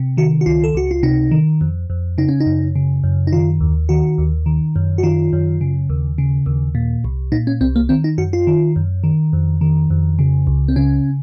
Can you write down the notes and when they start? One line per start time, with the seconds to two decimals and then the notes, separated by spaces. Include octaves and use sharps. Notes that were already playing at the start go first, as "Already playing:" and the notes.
Already playing: C3
0.17 D#3 F#4
0.41 F#4
0.46 C#2 F4
0.64 A4
0.75 C#2 F#4
0.91 F4
1.03 C3 D#4
1.31 D#3
1.61 F2
1.90 F2
2.18 C#3 D#4
2.29 C#4
2.40 D#4
2.46 F#2
2.76 C#3
3.04 F#2
3.27 D#4
3.32 D#3 F4
3.61 D#2
3.89 D#3 F#4
4.18 D#2
4.46 D#3
4.76 F#2
4.98 F#4
5.03 D#3 F4
5.33 F#2
5.61 C#3
5.90 D#2
6.18 C#3
6.46 D#2
6.75 A#2
7.04 C2
7.32 A#2 D#4
7.47 C#4
7.61 C2 C4
7.76 A#3
7.89 D#3 C4
8.04 D#4
8.18 F#2 F#4
8.33 F4
8.47 D#3
8.76 F#2
9.04 D#3
9.33 F2
9.61 D#3
9.90 F2
10.19 C#3
10.47 C#2
10.68 C4
10.76 C#3 C#4